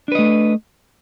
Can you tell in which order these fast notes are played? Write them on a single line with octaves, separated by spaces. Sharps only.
D4 B4 D#5 A3